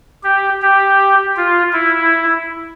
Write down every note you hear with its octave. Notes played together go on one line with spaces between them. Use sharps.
G4
G4
F4
E4